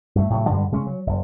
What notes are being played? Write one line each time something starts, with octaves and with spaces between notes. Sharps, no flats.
G2 A3
A2 C#3 F#3
G2 D3 G3 G#3
C#3 G#3 C#4
F#3
F#1